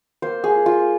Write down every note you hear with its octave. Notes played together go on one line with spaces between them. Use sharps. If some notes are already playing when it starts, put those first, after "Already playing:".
A#3 C5
G#4
F4
F4